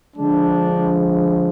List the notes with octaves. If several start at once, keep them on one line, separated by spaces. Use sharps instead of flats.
D3 F3 G#3 D4